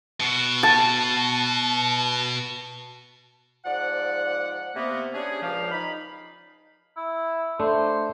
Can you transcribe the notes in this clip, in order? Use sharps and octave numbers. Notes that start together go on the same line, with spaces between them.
B2 F#4
A5
G#2 F3 D5 F#5
C3 A#3 B3
C#4 D4 G4 G#4
C#2 A#2 F3 G4 F5
D#4 B5
E4
A3 D4 C5